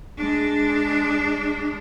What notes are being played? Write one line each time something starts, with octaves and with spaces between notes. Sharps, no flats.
G#3 D4